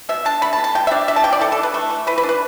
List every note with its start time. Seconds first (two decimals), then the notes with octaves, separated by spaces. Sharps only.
0.09 B2 E5
0.25 D4 A5
0.42 A3 B5
0.53 A5
0.59 B2
0.64 A5
0.75 B2 G5
0.87 E5
0.91 D4 D5
1.08 A3 E5
1.16 A5
1.24 E3 G5
1.33 D5
1.41 E3 A4
1.52 A4
1.58 D4
1.63 B4
1.74 A3
1.90 E3
2.07 E3 B4
2.18 B4
2.23 D4
2.29 B4